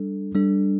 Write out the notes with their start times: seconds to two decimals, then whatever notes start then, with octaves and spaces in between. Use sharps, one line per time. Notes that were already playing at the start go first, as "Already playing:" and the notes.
Already playing: G3 D4 A4
0.34 G3 D4 A4